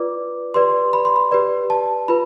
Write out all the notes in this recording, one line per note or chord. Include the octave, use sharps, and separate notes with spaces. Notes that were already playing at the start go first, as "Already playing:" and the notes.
Already playing: F4 B4 D5 D6
G4 B4 D5 C6
B5
C6
B5
G4 B4 D5
A5
F4 B4 B5